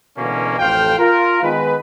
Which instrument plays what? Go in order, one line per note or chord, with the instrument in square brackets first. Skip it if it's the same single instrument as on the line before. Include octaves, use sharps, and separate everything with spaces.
[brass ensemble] B2 D3 E3 G#3 A#3 C#4
A1 F2 A4 C5 F5 G5
F4 A#4
D#3 G#3 B3 B4